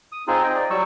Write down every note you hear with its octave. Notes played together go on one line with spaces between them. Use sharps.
D#6
C4 D#4 F4 G#4
D#5 G5
D5
F#3 G3 C#6 E6